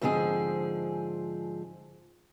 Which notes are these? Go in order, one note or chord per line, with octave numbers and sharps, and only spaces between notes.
G#2 D3 F3 C4 G#4